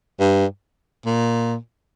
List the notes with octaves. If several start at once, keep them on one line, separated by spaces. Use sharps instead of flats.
G2
A#2